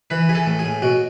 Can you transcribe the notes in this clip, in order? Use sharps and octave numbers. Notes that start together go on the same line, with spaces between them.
E3 B4
E3 G#4
A4
A2
G#4
A2
B2 F#4